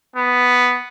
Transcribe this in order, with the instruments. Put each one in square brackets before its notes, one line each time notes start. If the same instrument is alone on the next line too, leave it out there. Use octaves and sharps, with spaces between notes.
[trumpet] B3